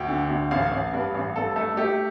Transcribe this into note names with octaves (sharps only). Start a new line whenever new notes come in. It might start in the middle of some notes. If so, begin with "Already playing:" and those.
Already playing: D2 G5
D3
D2
A1 F5
A1
G2
A1
G2 A4
A3 A4
A3 G4